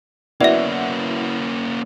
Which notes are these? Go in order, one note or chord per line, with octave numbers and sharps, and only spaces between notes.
A#3 B3 C#4 E4 F#4 D5 E5